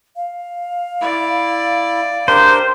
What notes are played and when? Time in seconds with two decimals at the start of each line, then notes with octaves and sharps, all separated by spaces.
0.16 F5
1.01 E4 D5
2.28 D4 G4 A#4 C5